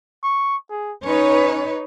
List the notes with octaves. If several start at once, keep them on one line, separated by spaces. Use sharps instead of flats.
C#6
G#4
C#4 D#4 B4 C#5